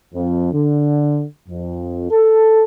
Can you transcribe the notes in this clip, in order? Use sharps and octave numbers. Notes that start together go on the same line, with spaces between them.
F2
D3
F2
A4